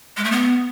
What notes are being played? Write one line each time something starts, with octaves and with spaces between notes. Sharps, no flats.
G#3
A3
B3